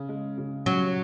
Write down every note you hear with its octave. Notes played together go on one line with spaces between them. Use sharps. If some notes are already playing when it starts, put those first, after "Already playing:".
Already playing: C#3
G#3
C#3
F#3 C#4